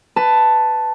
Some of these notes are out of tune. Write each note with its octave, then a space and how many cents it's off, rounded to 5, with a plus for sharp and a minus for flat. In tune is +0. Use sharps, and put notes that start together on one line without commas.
B4 +15 A5 +0